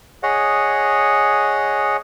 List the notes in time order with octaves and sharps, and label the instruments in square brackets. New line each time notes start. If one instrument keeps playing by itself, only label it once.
[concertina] G#4 C#5 D#5 F#5